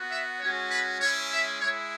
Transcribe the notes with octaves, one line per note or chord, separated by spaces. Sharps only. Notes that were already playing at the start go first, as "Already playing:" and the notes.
Already playing: B3 F#4
E5
G#3 C#4 F#4 C#5
B4
G#3 C#4 E4 C#5
E5
G#3 E4 C#5